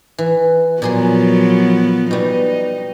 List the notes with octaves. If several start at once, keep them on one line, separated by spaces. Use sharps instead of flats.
E3
A#2 F3 F#3 B3 G#4 C6
B2 G3 D#4